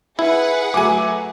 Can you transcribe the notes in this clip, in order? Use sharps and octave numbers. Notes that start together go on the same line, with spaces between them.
E4 G#4 B4 F#5
F#3 A3 G#5 D6